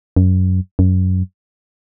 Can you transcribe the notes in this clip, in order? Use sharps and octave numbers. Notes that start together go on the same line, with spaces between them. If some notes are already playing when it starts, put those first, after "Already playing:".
F#2
F#2